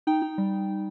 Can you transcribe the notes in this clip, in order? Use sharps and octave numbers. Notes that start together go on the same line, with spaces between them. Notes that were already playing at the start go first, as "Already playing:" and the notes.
D#4 G5
D#4
G3